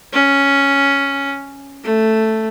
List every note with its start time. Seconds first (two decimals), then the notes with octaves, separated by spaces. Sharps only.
0.13 C#4
1.83 A3